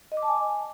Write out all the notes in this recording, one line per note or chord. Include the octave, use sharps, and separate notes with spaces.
D#5
D6
A5
G#5